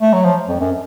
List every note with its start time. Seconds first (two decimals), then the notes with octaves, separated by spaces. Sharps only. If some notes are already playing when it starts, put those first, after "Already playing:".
0.01 A3
0.13 F#3
0.24 F3
0.48 F2
0.60 F#2